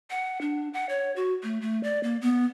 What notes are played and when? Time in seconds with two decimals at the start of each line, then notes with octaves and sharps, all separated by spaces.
0.10 F#5
0.41 D4
0.74 F#5
0.89 C#5
1.16 F#4
1.43 A3
1.61 A3
1.83 D5
2.03 A#3
2.21 B3